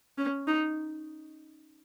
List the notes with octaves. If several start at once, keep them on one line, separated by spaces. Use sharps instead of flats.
C#4
D#4